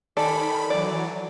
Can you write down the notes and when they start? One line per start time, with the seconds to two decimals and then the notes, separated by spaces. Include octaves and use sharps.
0.17 D#3 A4 C5 D5 G#5 B5
0.70 E3 F#3 D5